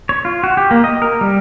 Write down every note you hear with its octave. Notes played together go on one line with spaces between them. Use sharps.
C#5
F4
F#4
G4
A#3
D#5
A#4
G3